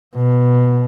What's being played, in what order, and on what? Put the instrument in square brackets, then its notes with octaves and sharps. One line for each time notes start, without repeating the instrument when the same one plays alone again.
[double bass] B2